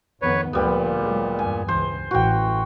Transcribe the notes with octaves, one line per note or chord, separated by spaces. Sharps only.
F2 D#3 B3 B4 C#5
D2 A#2 F3 G3 B3
F#3 G#3
E2 G2 G#5
C#2 E3 C5
A1 E3 F#4 G5